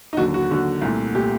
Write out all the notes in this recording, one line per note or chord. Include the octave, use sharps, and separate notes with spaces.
D#4
D#2 D3 F#3 F#4
F#4
D#2 D3 F#3
C2 A#2 A3
A#2 A3 G4